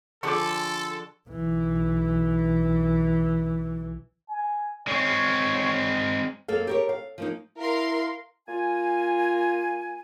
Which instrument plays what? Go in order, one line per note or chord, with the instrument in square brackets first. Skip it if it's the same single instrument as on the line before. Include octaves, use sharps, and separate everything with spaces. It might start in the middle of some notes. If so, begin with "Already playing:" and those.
[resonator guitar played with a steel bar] D3 F3 G#4 [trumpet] A4 [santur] C#6 D6
[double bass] B1 E3
[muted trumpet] G#5
[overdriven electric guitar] G#3 C4 [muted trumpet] C#5
[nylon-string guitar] F#2 A#3 A4 F5
G4 A#4 C#5
F5
F3 A#3 D#4
[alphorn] E4 [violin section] A#4 F5 C6
[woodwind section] A#3 F4 G#5